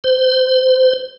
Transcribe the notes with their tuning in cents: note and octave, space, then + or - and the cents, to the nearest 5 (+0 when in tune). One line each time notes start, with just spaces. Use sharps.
C5 -25